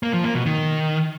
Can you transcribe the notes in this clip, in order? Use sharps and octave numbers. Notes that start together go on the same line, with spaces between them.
A#3
F3
A#3
B2
D#3